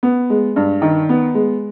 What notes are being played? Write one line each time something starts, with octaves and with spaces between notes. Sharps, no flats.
B3
G#3
G2
D#3
B3
G#3